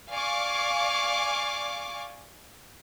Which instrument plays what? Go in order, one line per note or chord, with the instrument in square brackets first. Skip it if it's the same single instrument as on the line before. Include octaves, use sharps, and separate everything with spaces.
[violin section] D5 F5 G#5 C#6 D6